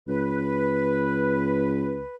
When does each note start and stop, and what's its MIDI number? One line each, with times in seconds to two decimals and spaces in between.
0.08 2.02 37
0.08 2.15 71